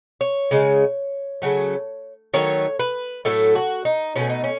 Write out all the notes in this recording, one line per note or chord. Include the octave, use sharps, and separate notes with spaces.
C#5
C#3 G#3
C#3 F#3 A3
D#3 F#3 A3 C#5
B4
A2 F#3 A3 A4
F#4
D#4
B2 A3 C#4
D#4
C#4